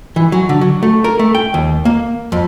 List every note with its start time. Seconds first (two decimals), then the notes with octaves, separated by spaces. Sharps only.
0.16 E3
0.32 F#3
0.49 D3
0.61 F#3
0.83 A3
1.04 A#4
1.19 A3
1.35 G5
1.54 D#2
1.85 A#3
2.32 F2